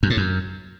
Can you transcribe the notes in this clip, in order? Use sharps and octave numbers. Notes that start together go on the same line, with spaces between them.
F#2
A2
F#2